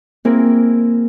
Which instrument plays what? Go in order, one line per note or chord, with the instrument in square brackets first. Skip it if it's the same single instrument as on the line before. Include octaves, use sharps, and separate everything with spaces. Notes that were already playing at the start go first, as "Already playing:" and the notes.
[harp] A#3 C4 E4 G#4 A#4